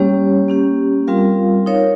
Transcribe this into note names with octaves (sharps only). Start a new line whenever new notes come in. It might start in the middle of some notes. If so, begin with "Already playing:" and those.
Already playing: G3 A#3 C#4 G4 C#5
A#3 C#4 G4
G3 C4 F4 A#4 F5
D#4 A#4 C#5 F5